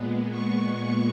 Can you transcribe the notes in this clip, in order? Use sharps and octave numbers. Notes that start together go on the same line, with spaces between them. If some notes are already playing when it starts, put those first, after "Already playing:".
Already playing: A#2 G#3 B3
C#6